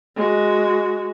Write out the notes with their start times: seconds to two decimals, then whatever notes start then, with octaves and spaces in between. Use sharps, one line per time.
0.16 G#3 F#4